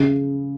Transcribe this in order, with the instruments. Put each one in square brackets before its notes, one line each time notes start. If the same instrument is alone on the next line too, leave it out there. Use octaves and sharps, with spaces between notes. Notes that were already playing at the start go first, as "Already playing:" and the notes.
Already playing: [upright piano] C#3